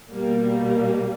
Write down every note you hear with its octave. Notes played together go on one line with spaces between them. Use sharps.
B2 G3 A#3